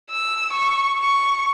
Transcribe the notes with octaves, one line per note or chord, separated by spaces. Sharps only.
E6
C#6
C#6